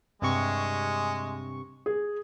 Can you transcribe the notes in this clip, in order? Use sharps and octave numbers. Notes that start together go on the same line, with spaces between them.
G2 C3 G#3 C#6
G#4